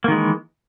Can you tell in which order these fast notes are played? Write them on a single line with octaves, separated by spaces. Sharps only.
A#3 D#3 G#3 E3